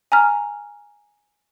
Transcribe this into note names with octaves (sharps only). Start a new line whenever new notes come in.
G#5 A#5 F6